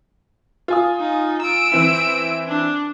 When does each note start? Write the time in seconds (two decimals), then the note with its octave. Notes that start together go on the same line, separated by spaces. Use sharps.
0.68 F4 G#5 D#6
1.00 D#4
1.42 E6 D7
1.72 E3 C4 E4
2.48 D4